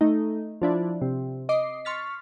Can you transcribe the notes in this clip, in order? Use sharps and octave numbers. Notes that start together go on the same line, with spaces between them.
A3 D#4
F3 D4 E4
C3
D#5 D6 C7
C6 C#6 F6 A6 B6